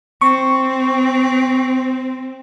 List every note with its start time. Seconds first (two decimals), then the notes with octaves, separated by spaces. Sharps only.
0.21 C4 C#6